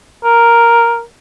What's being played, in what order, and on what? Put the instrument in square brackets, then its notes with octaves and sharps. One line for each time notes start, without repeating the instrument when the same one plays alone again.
[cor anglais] A#4